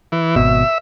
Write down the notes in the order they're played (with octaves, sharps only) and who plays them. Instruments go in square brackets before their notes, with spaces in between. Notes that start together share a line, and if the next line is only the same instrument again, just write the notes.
[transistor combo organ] E3
[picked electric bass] G#1 B2 [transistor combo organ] E5